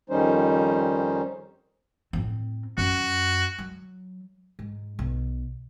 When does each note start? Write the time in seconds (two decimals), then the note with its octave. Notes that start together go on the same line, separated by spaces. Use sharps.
0.10 F2 D#3 G3 C#4 D#4 C5
2.13 A2 C4
2.78 F#2 F#4
3.58 F#3
4.59 G#2
4.99 B1